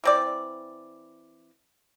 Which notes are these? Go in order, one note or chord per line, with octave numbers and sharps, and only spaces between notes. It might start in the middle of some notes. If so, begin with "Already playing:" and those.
E3 C4 D5